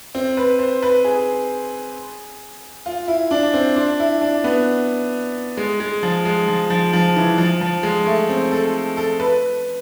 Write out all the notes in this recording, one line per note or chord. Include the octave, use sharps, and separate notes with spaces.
C4
B4
C5
B4
G#4
F4
E4
D4
C4
D4
E4
D4
B3
G#3
G#3
F3
G#3
F3
F3
F3
E3
F3
F3
G#3
A3
C4
A4
A4
B4